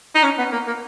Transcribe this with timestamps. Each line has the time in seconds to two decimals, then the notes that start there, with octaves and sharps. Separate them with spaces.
0.15 D#4
0.23 C#4
0.38 B3
0.52 A#3
0.67 A#3